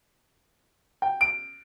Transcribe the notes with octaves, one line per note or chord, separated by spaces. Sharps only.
G5
D7